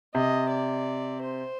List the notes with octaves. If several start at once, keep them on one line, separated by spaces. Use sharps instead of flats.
C3 D#5
D5
C5